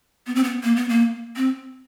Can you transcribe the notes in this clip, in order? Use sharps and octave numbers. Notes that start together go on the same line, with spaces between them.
B3
C4
B3
A#3
B3
A#3
C4